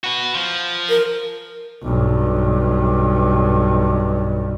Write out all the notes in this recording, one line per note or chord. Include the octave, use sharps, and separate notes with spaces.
F#4 B4
F3
A#4
B1 G2